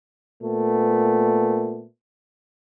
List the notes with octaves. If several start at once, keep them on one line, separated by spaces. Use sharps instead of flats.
A#2 A3 B3